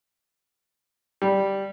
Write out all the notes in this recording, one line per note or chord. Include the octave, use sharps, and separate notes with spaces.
G3